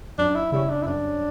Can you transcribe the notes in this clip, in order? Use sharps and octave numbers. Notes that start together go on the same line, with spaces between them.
F#2 D4
E4
C#3 G3 C#4 E4
D4
E4
F#2 D4